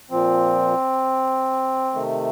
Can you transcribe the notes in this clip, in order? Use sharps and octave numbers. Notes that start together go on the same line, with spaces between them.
A#2 F3 C4
C3 D#3 A3